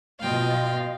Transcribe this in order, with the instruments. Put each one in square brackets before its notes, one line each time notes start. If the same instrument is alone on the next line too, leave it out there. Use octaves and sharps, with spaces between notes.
[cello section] B2 F4 D#5 [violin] F5 G5